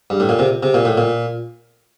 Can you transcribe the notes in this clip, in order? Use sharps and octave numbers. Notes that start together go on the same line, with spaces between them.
G2
A2
A#2
C3
C3
A#2
A2
A#2